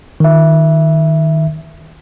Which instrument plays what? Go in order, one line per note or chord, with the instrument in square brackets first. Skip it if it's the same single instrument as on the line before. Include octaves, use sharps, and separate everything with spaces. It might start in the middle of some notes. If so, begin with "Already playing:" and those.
[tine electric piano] D#3 E5